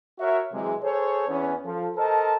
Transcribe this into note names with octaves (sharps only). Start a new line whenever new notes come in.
F#4 A#4 C#5 E5
C3 E3 F#3 G#3
G#4 A4 C5 C#5
E2 B3 C#4
F3 A4
A4 A#4 C5 D#5 A5